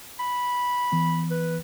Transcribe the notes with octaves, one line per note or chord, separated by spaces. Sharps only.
B5
E3 B3
B4